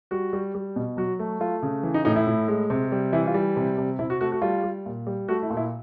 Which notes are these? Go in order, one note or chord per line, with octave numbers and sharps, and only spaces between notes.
G3 F#4
G3
G3
B2
F#3 F#4
A3
A3 F4
C#3
E3
D#4
A2 D#4
E4
A2
G#3
C3
G3
E3 E4
F4
G3
C3
C3
C3 E4
F#4
A3 F#4
F#4
G3 F4
G3
A#2
G3
A3 F#4
E4
A#2
E4